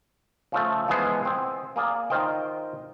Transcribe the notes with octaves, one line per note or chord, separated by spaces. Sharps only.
C#3 F3 A3
E3 F3 G#3 B3 G#4 C5
C4 G#4
A#3 G#4 D5
D#3 F4 C5 D#5 G5